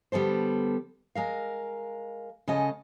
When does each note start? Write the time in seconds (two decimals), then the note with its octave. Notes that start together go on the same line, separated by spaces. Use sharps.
0.12 D3 G3 B3 A4 C5
1.15 G#3 A#4 F5
2.48 C#3 G#3 C#4 A4 D#5